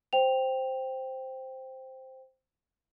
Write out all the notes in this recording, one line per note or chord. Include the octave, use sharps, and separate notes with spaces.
C5 G5 F7